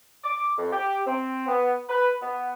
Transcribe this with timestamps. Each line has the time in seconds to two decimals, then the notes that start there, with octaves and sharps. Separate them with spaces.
0.23 D6
0.58 F2
0.72 G4
1.07 C4
1.47 B3
1.89 B4
2.21 B3